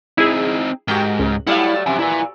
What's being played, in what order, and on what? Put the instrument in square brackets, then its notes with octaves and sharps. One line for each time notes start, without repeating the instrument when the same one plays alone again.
[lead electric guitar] C4 D#4 [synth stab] E4 G#4
[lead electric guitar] G#2 [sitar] F#4 G4 A#4 [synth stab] G5
[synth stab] C#2
[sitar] F#3 G3 A3 [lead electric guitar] E4 [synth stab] F5 F#5
[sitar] F#2 C3 [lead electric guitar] E5 G#5
[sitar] A#2 [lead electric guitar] E4 B4